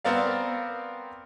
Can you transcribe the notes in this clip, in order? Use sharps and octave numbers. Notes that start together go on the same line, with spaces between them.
B3 C4 A#4 D5 F5